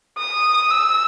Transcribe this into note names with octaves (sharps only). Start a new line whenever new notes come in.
D#6
E6